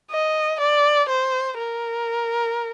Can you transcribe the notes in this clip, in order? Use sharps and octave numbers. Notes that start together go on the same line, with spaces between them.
D#5
D5
C5
A#4